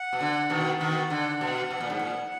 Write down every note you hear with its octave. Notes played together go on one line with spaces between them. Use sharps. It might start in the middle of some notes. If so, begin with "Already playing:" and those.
Already playing: F#5
B2
D3
B2 D#3
B2 D#3 F#5
D3
B2
B2
A#2
G#2
A#2